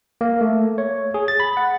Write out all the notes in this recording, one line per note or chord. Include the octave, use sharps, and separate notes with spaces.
A#3
A3
C#5
G#4
A6
B5
F#5